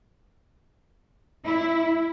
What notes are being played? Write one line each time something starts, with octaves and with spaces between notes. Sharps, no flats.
E4